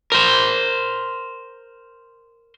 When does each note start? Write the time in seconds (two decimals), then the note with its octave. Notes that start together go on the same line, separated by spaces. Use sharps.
0.12 A#4 C5